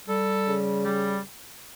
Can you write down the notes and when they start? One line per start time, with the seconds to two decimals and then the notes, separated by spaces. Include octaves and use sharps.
0.08 G3 A4
0.46 C#3
0.85 G3